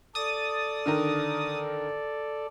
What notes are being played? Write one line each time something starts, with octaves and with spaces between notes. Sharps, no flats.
A4 D5 D#6 A6
D3 D#3 A#4